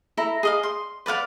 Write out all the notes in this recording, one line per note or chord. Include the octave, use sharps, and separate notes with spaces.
E4 A4 A#5
G#4 D#5 F5
C6
B4 D5 F5 F#5